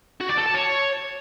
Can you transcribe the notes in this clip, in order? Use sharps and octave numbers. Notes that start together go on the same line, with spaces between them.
F#4
D5
A4
A5
C#5